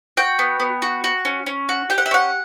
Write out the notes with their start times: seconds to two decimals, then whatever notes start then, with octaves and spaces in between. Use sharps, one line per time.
0.17 F#4 G5
0.39 B3
0.60 B3
0.82 F#4
1.04 F#4
1.25 C#4
1.46 C#4
1.69 F#4
1.90 G4 G5
1.98 F#5
2.06 E5
2.11 C#4 F#5